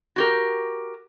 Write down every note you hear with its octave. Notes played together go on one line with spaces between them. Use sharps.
F#4 G4 A#4